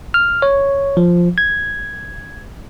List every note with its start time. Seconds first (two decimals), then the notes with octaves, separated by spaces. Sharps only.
0.14 F6
0.42 C#5
0.97 F3
1.38 G#6